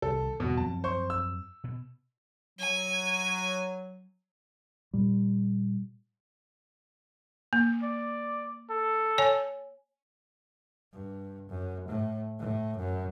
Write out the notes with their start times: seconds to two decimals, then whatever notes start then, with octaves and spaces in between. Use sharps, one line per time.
0.02 C2 C3 D#3 A4
0.40 G1 E2 G#2 B2 F#4
0.57 F#2 F3 C4 A5
0.84 C5 C#6
1.10 E6
1.64 B2
2.59 F#3 G#5
4.93 A#2 G3
7.53 A#3
7.83 D5
8.70 A4
9.18 C#5 G#5
10.93 G2
11.49 F#2
11.88 A2
12.39 A2
12.78 F#2